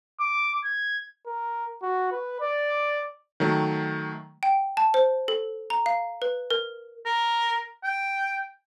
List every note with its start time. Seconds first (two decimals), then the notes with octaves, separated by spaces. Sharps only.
0.20 D6
0.65 G#6
1.27 A#4
1.82 F#4
2.12 B4
2.41 D5
3.40 D#3 F#3 A3
4.43 G5
4.77 A5
4.94 C5
5.28 A4
5.70 A#5
5.86 F5
6.22 B4
6.50 A#4
7.06 A#4
7.84 G5